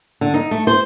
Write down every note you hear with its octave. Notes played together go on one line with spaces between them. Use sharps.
D3
D#4
A3
C5